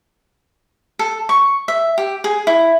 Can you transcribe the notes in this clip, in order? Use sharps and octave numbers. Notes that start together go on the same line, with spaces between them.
A4
C#6
E5
G4
G#4
E4